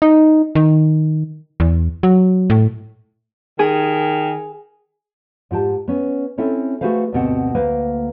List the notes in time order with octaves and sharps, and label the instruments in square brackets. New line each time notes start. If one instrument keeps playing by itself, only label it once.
[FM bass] D#4
D#3
E2
F#3
A2
[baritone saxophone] D#3 [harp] G#4 G#5
[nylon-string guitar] G#2 F4 G4 A5
B3 C#4
C4 C#4 E4 A4 C#5
A3 F#4 G#4 B4 C5 F5
D2 G2 B2 C4 F#5
D2 A#3 B4 C5